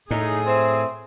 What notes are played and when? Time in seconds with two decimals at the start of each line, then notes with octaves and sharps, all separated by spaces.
0.11 A2 D#4 G#4
0.46 C4 C5 E5 C6